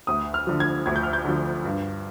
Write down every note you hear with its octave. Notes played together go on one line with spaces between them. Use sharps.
D2 D#6
F6
D3 F3
G#6
D2 G#6
G6
F6
G6
D3 F3
G2